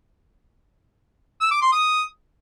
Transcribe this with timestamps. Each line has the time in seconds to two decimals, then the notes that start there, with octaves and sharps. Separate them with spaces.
1.41 E6
1.51 D6
1.62 C6
1.72 D#6